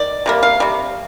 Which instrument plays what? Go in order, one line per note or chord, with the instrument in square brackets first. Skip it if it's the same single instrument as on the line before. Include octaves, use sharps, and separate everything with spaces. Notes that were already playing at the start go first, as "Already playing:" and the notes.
Already playing: [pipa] D#3 D5
C3 G3 A#3
F5
C3 G3